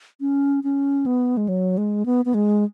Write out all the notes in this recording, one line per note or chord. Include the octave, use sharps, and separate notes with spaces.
C#4
C#4
B3
G#3
F#3
G#3
B3
B3
G#3